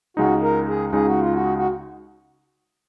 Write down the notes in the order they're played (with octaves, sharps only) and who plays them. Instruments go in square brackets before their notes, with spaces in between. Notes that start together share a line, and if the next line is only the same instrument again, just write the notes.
[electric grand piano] C#2 C#3 G#3 D#4 [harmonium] F#4
[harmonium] A#4
G#4
[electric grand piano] C#2 C#3 G#3 D#4 [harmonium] G#4
[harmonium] F#4
F4
F#4
F#4